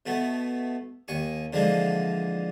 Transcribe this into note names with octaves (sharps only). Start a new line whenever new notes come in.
B2 A3 B3
D#2 G#5 C#6
D3 E3 F3 G#3 A#3